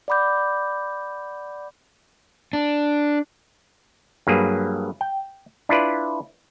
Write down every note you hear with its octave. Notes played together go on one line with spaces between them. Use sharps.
D5 F#5 B5 D6 G6
D4
G2 F#3 A#3 G#4 B4
G5
D4 E4 F4 B4 D5